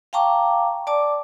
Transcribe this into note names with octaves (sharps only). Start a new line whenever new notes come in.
F5 G5 A5 A#5 C#6 D6
D5 A5 D6